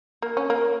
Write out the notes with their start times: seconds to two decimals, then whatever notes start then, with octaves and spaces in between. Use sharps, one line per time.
0.22 A#3
0.37 C#4
0.50 A#3